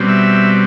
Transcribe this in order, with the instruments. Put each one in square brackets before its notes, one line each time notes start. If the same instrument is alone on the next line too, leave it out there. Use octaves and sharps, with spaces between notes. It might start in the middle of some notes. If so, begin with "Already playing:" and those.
Already playing: [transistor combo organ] B2 G3 C4
E5